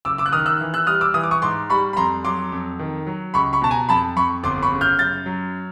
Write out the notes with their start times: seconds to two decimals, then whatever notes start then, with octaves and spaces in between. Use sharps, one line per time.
0.05 F#1 D6 E6
0.18 D6 E6
0.26 F#6
0.32 D#3 D#6 F6
0.46 E6 F#6
0.60 E3
0.74 E6 F#6
0.87 G3 D#6 F6
1.01 D6 E6
1.14 E3 D#6
1.24 D6
1.31 C#6 D#6
1.42 G#2 C6 D6
1.70 G3 B5 C#6
1.93 B5
1.97 F2 A#5 C6
2.25 F#3 C6 D6
2.52 F2
2.79 D#3
3.07 F#3
3.34 C#2 B5 C#6
3.53 B5 C#6
3.62 B2 A5
3.71 G#5 A#5
3.89 F2 A5 B5
4.16 F2 B5 C#6
4.43 G1 C6 D6
4.62 B5 C#6
4.72 C#3
4.81 F6 G6
4.99 F#2 G6 A6
5.26 F#3